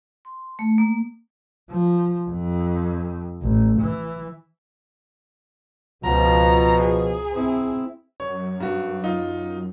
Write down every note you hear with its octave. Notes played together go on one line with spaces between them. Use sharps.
C6
A3
A#3
F3
F2
A1
E3
C#2 B2 F3 A#5
G#4
C4 E4
F#2 C#5
G2 F#4
D#4 F4